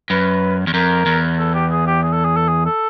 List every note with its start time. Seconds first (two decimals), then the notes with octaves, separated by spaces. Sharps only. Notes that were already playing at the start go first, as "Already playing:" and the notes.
0.10 F#2 B4
0.67 E2
0.74 F2 A#4
1.06 E2
1.39 A4
1.54 G4
1.71 G#4
1.87 G4
2.03 G#4
2.13 A4
2.24 G#4
2.36 A4
2.48 G#4
2.66 A4